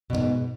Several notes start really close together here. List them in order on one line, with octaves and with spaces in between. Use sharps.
B2 E2 G#2